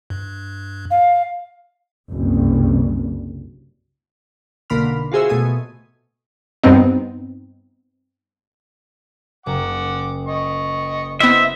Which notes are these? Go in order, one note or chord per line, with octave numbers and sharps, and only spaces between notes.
G2
F5
F#1 C2 G2
B1 D3 A#3 B5 C6 F6
F4 F#4 G#4 C5 E5
B2 A3 G#5 D#6
G2 B3 C4 D#4
F#1 F#5 D6
D#5 C#6
B3 E4 C5 D#5 E5 C6